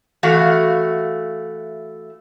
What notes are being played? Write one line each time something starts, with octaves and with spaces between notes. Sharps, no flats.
E3 A3 F#4 F5